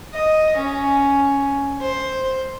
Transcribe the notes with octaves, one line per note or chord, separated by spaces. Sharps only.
D#5
C#4
C5